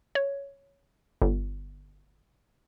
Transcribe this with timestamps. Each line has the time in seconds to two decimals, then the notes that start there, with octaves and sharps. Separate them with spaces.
0.15 C#5
1.22 G1